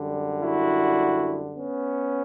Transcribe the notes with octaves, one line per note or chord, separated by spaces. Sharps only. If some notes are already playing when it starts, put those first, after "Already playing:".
Already playing: F#2 D3 G3
E4 F#4
B3 C#4